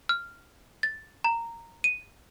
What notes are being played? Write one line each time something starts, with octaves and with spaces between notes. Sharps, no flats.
F6
A6
A#5
D#7